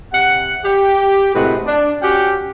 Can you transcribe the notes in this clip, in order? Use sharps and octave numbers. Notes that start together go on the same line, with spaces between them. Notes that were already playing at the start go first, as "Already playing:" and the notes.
C3 F#5
G4
A2 C3 G#3 F#4 B4
D4
C#4 F#4 G4 F#5 G5